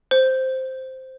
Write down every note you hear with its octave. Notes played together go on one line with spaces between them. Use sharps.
C5